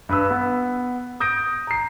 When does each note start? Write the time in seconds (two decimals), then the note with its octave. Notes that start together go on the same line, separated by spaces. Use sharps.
0.09 G2 B4 E6
0.30 B3
1.20 D#6 G6 A#6 D7
1.67 A#5 C7